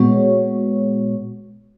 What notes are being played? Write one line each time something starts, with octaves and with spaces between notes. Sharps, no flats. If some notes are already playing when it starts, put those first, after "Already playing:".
Already playing: A#2 G#3 B3 F#4 C#5